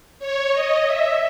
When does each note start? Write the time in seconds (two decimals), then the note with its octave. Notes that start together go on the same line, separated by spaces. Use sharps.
0.19 C#5
0.52 D#5
0.84 E5